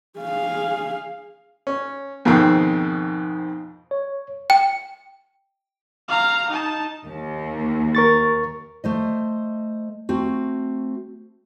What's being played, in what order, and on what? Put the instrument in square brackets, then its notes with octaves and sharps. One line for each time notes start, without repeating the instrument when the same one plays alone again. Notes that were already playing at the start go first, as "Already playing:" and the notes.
[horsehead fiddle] G#4 F5
[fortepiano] C#4
F2 G#2 B2 D#3 C4
[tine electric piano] C#5
[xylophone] G5
[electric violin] F5 A#5
D#4 A5
[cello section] D#2
[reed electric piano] A#4 C#6 A6
[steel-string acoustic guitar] A3 C5 D#5
A3 C4 F#4